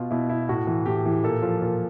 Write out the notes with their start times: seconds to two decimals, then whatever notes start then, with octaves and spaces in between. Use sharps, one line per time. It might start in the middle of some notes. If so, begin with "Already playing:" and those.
Already playing: B2 F4
0.11 B2 E4
0.30 E4
0.49 A2 F#4
0.67 E3
0.86 A2 G4
1.05 E3
1.24 A#2 A4
1.42 F3
1.62 A#2